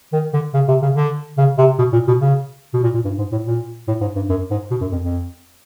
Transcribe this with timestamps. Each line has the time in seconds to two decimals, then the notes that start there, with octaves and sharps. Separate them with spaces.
0.13 D#3
0.33 D3
0.54 C#3
0.68 C3
0.82 C#3
0.96 D3
1.37 C#3
1.58 C3
1.79 B2
1.93 A#2
2.07 B2
2.20 C#3
2.73 B2
2.83 A#2
2.94 A#2
3.05 G2
3.18 G#2
3.32 A2
3.46 A#2
3.88 A2
4.01 G#2
4.15 G2
4.29 F#2
4.50 G#2
4.71 B2
4.81 F#2
4.92 F2
5.02 F2